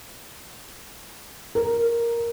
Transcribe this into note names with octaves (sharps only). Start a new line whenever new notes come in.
A#4